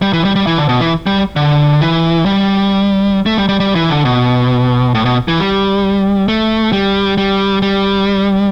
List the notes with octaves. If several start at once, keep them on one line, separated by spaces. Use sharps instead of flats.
G3
E3
G3
G3
E3
D3
B2
E3
G3
D3
E3
G3
A3
G3
G3
G3
E3
D3
B2
A2
B2
E3
G3
A3
G3
G3
G3